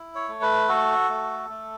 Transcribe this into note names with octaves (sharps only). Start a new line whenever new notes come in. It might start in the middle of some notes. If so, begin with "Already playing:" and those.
Already playing: E4
C#5
A3
B4
F#4 A4
A3
A3